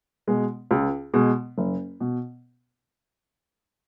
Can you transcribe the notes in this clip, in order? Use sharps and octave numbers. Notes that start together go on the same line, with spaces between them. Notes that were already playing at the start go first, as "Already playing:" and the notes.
B2 G#3
C#2
B2 G#3
F#1
B2